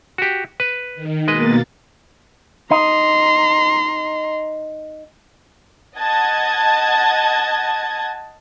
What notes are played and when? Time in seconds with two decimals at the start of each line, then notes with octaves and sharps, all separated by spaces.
0.18 F#4 G4
0.60 B4
0.95 D#3
1.28 B2 G#3 A#3 B4 D#5 A6
2.71 D#4 A#5 C6
5.96 D#5 F#5 A5 G#6